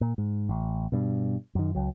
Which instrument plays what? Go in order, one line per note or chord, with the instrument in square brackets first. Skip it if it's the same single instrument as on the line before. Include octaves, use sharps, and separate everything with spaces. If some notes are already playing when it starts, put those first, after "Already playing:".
[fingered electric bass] A#2
G#2
A1
G2 B2
F#2 D#3
C#2 F#3